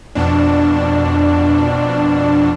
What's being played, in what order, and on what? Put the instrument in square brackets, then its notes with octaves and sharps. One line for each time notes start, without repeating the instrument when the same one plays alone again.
[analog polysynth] F2 B2 D4